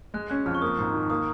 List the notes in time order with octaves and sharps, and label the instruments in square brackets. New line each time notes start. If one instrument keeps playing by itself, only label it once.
[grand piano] G#3 [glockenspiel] F#6
[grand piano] C#4 [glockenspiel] F#6
[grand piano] F2 [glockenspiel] F6
[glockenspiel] C#6
[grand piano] A#3 [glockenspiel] D#6
[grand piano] G#2
D#3
[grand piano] A#3 [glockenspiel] D#6